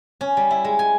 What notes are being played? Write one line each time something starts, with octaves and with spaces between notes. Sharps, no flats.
C#4
G3
E4
G#3
G#5